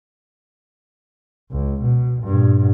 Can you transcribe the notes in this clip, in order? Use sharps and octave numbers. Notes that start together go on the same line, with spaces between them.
C#2
B2
G2 A#2